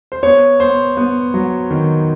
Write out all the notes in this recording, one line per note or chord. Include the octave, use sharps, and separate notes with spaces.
C5
B3 C#5
B3 C5
B3
F#3
D#3